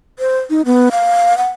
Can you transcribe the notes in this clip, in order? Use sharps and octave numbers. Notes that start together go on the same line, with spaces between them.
C5
D#4
B3
F5
F#5